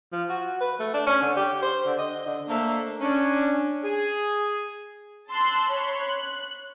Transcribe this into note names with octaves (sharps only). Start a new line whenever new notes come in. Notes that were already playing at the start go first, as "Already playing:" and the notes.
F3
F#4
B4
A3
D4
C#4
D3
G4
C5
D3
D#5
D3
A3 A#3 D4 A4 C5 E5
C#4 D4
G#4
A5 C6 E6 F#6
C#5 B5 C6
F#6